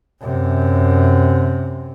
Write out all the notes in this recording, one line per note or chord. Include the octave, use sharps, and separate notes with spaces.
F#2 C3